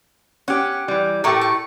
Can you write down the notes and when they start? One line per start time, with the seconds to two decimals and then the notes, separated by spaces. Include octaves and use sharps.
0.48 C#4 G4 F#5
0.88 E3 G3
1.24 A2 A3 G4 A#4 C#6
1.41 C#6